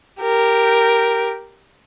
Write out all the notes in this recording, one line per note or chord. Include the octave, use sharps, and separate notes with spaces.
G4 A#4